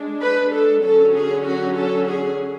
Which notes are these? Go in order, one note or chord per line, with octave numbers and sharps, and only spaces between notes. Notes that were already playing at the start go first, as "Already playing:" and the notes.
Already playing: G#3 D4
B4
A4
D3 F#3 C#4 A4
G#4
F#4
A4
G#4